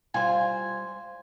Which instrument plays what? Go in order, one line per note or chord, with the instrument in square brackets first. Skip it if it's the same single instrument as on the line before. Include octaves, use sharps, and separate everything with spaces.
[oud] G3 F4 [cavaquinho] C5 G#5